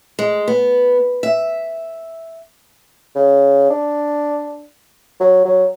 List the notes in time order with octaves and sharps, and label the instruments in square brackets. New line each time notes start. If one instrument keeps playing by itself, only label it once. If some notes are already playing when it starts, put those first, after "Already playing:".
[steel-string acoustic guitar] G#3
B3
E5
[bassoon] C#3
D4
F#3
F#3